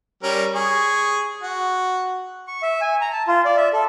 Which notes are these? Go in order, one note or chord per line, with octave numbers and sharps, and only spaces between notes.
G3 C#4 A#4
G#4 C#6
F#4
C#6
E5
G#5
A#5
A5
F4
D5
E5
A4